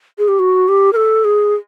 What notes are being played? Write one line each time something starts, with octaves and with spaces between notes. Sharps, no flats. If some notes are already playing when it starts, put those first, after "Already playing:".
G#4
G4
F#4
G4
A#4
A4
G#4